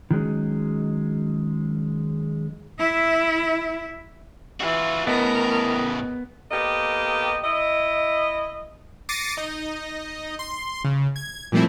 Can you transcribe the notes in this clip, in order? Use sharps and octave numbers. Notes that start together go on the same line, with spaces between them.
D#3 F#3 G#3 C#4
E4 E5
E3 F4 F#4
A2 C#3 B3 A#4 D#5
A#3 B3 G4 A4 D#5
E4 D#5
D6 A6 A#6 C7 C#7 D#7
D#4 D#5
C6
C#3
G#6
A#2 F3 G3 A3 C4 E4